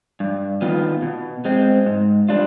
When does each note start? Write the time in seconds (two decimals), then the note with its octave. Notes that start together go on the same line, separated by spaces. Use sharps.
0.20 G2
0.62 D#3 B3 F4
1.02 B2
1.45 G#3 C4
1.86 G#2
2.29 G3 D4 F4